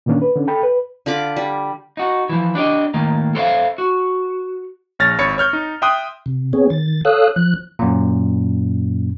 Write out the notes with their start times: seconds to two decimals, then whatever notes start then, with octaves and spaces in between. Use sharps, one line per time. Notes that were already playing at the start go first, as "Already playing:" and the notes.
0.06 A#2 D3 D#3 A#3 C#4 D4
0.22 B4
0.36 D3 C#4
0.47 A4 G5 B5
0.63 B4
1.06 D3 F4 B5 D6
1.36 G3
1.97 D#4 F#4
2.29 E3 F3
2.55 D4 G4 D5 D#5
2.94 A2 D#3 A#3
3.35 A4 A#4 C5 D5 E5 F5
3.78 F#4
4.99 A#1 C#5 F6 A6 A#6
5.18 G#1 C#5 B5 A6 C#7
5.38 C#5 F6 G6
5.53 D#4
5.82 E5 G5 C6 D#6 F#6
6.26 C3
6.53 B3 C4 G#4 C#5
6.70 D#3 A6
7.05 A4 C#5 F5 D#6 E6 F#6
7.36 F3 F#6
7.79 F#2 A#2